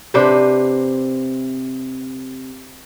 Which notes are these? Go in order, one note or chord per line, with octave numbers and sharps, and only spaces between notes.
C3 D4 B4 C5